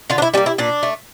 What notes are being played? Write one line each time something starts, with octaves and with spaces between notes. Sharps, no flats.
D3 F4
D4
E4
G3 A#3 C#4
E4
A#2 D4
A3